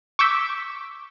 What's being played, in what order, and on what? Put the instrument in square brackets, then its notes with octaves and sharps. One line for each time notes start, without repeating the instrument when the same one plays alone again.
[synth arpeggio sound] C#6 D6 E6 G6 B6